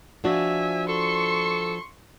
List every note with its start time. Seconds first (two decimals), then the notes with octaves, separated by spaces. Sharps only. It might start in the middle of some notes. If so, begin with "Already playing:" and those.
0.24 F3 D4 F#4 E5 G#5
0.89 A4 C6 C#6